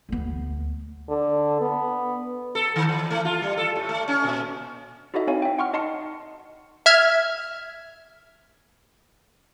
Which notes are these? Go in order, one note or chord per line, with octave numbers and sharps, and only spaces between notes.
D2 B3
D3
B3
A4
D#3
E3
A3
F4
G3
A4
A2
A3
C#4
A#2
D#4 E4 F#4 A4 D#5 E5
C4 D#4 C#5 F5 G#5
E5 G5
F#5 C6 C#6 F6
D#4 D#5 A5 C6 C7 C#7
E5 F6 G#6